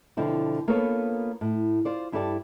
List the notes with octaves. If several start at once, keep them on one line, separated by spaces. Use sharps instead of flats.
B2 D3 F3 C4 E4
A#3 B3 F4 A4 B4 C#5
A2
F4 C5 D5
G2 E4 G4 A4 D5 A5